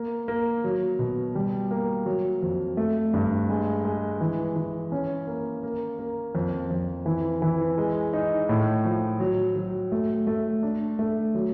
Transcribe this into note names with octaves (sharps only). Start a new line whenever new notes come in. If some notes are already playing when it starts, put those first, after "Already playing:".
Already playing: A#3
A#3
F#3
B2
G3
A#3
F#3
F2
A3
G2
G#3
G#3
E3
E3
C#4
A#3
A#3
A#3
F2
F2
E3
E3
G#3
D#4
A2
F3
F#3
F#3
A3
A3
D4
A3
F#3